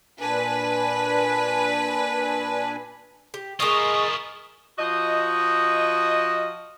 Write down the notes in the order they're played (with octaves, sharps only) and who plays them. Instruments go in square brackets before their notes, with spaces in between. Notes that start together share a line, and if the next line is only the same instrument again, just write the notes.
[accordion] A#2 D4 G#5 [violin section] B4
[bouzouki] G4
[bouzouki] G#3 D#5 [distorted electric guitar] E4 F4 [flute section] A#4 C#6 [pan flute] D#6
[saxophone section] F3 F#4 D#5